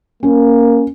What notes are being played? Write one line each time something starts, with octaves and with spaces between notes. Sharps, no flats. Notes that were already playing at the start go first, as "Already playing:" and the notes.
A#3 C#4